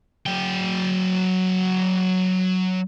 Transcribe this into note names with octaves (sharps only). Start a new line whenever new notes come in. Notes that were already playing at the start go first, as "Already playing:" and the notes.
F#3 G5